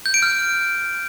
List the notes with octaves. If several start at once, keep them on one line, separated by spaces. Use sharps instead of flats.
G6
D7
F6